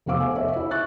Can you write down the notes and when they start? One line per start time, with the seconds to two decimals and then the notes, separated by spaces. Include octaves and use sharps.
0.06 F1 B3 C5 F5 D6 E6
0.20 A4 F5 G#5
0.36 C#5 D#5 E5
0.53 E4 E5
0.71 C#6 F#6 A6